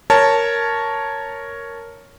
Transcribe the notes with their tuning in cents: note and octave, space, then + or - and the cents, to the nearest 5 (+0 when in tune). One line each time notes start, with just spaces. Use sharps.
A#4 +0 C#5 +0 A5 +0